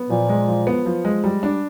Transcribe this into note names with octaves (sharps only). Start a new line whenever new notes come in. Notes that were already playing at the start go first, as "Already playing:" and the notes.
Already playing: B3
A#2 F3
G#3
F3
B3
F3
G#3
G3
D4